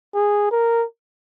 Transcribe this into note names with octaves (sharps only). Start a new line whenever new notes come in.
G#4
A#4